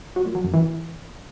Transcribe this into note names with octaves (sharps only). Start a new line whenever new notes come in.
F#3
A#2
F#3
F#2
E3